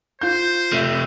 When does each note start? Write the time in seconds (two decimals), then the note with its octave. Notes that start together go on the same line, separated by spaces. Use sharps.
0.21 F4 C5 G6
0.73 C3 A3